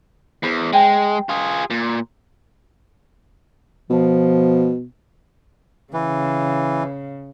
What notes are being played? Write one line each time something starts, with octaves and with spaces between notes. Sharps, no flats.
E2 C5 B5
G#3 C5 G5 G#5
F4 G#4
A#2
B2 F3
C#3 E3